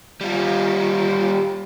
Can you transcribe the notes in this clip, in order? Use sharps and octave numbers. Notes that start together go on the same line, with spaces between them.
G3 F4